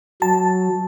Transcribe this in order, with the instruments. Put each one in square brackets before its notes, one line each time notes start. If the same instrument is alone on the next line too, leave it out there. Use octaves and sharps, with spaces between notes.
[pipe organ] F#3 [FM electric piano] A5